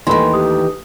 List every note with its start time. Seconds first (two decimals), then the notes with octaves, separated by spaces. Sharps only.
0.07 D#2 D#3 E3 A3 B5 C6
0.34 G4 D#6